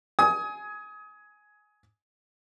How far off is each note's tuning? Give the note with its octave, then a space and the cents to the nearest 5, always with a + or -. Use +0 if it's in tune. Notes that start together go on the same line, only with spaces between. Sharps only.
G#5 +15 D#6 +30